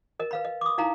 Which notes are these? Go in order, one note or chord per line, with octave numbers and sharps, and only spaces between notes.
A#4 D#5
B4 F5 B5
D#5
D6 D#6
D#4 E4 F5 A#5